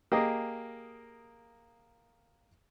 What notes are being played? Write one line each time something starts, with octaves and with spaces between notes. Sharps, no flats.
A#3 G4 G#4 D#5